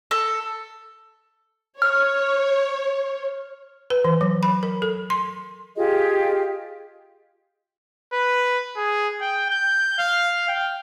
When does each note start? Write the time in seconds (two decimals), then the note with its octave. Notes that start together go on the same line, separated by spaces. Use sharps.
0.11 A4
1.82 C#5 F6
3.90 B4
4.05 E3
4.21 F#3
4.43 B5
4.63 A#4
4.82 A4
5.10 C6
5.77 F4 G4 G#4 D#5
8.13 B4
8.77 G#4
9.21 G5
9.50 G6
9.99 F5
10.48 G5